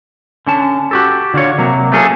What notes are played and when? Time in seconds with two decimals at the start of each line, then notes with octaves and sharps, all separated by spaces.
0.47 D3 C#4 A5
0.91 F#4 G4 A4
1.34 D3 D4 F4 C#5
1.58 C3 F#3 A#3
1.92 A3 A#3 C#4 G#4 A4